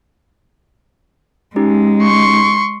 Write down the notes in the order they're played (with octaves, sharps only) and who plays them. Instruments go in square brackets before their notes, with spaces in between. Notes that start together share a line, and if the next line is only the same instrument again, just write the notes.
[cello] G#3 [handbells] C#4 D#4 G4
[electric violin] C6 C#6